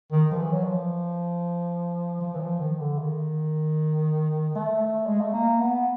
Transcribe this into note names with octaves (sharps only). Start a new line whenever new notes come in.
D#3
F3
E3
F#3
F3
F3
E3
F3
D#3
D3
D#3
A3
G#3
A3
A#3
B3